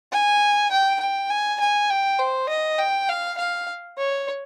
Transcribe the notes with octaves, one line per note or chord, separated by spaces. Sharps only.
G#5
G5
G5
G#5
G#5
G5
C5
D#5
G5
F5
F5
C#5